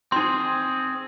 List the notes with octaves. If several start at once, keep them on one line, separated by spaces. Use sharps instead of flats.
C4 D#4 G#4 C6